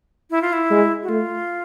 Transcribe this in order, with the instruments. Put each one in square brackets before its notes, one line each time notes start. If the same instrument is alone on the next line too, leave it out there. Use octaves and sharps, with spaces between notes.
[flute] E4
F4
E4
[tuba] G#3
[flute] F#4
[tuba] A3 [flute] F4